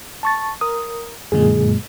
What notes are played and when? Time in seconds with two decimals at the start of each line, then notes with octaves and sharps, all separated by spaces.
0.23 A5 C#6 A6
0.61 A#4 D#6
1.32 F#2 A#2 D3 G#3 G#4